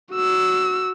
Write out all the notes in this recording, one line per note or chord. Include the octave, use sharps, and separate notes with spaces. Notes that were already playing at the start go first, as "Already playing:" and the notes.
F#4 E6